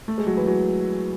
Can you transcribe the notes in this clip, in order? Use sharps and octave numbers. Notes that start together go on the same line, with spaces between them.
A3
G#3
F#3
E3
F#3